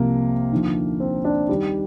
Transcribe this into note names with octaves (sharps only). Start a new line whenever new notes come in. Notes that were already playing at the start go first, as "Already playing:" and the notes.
Already playing: C2 C3 F3 A#3
D#2 D3 F3
C4
D4
D#2 D#3 G3